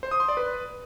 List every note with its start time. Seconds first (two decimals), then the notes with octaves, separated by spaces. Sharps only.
0.03 C5
0.11 D#6
0.20 C6
0.28 D5
0.37 B4